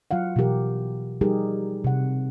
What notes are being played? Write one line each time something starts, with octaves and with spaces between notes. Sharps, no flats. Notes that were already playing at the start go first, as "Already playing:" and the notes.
F#3 F4 F5 F#5
B2 E3 F#3 G4 A#4
F3 G3 D#4 G4 G#4 A#4
C3 F#5